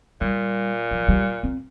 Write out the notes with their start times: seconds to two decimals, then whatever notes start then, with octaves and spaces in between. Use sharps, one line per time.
0.21 A#2 G3
0.91 F3
1.08 G3
1.43 C4